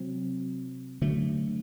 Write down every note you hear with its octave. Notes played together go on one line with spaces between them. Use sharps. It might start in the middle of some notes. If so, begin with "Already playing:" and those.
Already playing: C3 F#3 C4
D3 F#3 A3